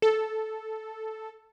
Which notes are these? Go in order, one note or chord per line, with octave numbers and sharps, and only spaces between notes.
A4